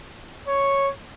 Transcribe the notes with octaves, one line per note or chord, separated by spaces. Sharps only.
C#5